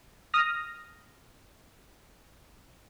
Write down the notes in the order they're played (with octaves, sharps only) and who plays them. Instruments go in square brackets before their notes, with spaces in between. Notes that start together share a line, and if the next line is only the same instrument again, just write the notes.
[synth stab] D#6 F6 A#6